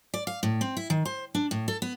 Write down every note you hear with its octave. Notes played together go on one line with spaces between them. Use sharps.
D5
F5
A2
C4
E4
D#3
C5
D4
A2
A4
B3